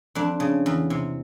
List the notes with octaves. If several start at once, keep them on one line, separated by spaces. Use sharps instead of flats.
F2 D4
C#3
E2
C3